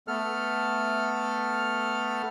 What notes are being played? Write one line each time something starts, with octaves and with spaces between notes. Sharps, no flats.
A3 B3 A4 F6